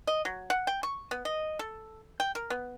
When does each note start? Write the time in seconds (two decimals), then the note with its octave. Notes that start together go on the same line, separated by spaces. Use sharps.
0.07 D#5
0.25 F#3
0.50 F#5
0.67 G5
0.83 C#6
1.11 B3
1.25 D#5
1.59 A4
2.20 G5
2.35 A#4
2.50 B3